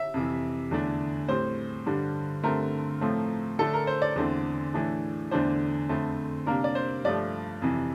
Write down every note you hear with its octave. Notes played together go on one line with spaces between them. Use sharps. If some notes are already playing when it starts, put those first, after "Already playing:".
Already playing: E5
F2 C3 E3
E2 D3 A3 D4
A2 G3 C4 C5
G2 D3 G3 D4
G2 D3 A3 C4 A#4
A2 F3 A3 C4
D3 A3 D4 A4
A#4
C5
D5
E2 D3 A3 C4
A2 E3 A3 D4
E2 D3 A3 D4 C5
F2 D3 A3 C4
C3 G3 A#3 D4 A#4
D5
C5
G2 F3 A3 D5
F2 C3 E3